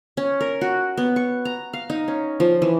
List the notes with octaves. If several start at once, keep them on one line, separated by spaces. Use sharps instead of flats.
C#4
A#4
F#4
B3
C#6
A#5
F5
D#4
C#4
F3
E3